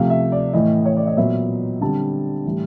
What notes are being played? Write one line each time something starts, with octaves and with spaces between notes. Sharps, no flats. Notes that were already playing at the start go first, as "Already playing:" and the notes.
Already playing: C3 F3 A3 F5
E5
D5
A2 E3 A3 D#5
C#5
D5
D#5
A#2 F#3 B3 E5
D3 G3 C4 A5
A2 E3 G3